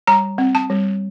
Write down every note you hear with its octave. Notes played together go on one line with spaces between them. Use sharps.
G3 A#5
C4
A5
G3